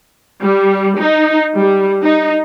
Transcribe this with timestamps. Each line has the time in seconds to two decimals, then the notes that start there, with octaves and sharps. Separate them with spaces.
0.42 G3
0.99 D#4
1.56 G3
2.02 D#4